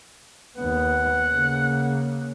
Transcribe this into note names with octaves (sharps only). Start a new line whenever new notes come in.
D#2 B3 F#5
C#3 A#3